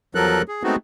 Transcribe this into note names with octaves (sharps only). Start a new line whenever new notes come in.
E2 F3 F#3 A4 A#4 F#6
G#4
G#3 A3 B3 C4 D#4 F#4